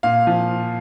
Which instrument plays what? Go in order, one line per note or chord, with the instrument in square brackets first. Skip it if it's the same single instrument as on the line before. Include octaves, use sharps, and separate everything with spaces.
[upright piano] A#2 F5
F3